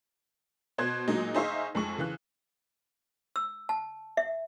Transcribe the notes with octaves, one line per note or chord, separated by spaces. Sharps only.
B2 C5 F#6 G#6
A#2 F#3 G#3 D#4
D#4 G#4 C5 E5 F5 C#6
F2 G#3 C#6
C#3 E3 F#6
E6
A5
E5